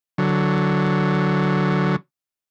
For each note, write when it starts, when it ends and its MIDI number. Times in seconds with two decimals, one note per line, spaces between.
0.18 1.96 50
0.18 1.96 54